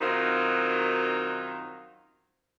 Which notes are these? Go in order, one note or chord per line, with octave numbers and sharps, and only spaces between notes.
F#2 D#3 C4 D#4 F4 F#4